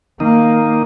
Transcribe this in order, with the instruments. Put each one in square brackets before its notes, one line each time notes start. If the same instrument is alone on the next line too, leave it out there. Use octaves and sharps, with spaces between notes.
[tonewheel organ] D#3 D#4 [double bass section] A#3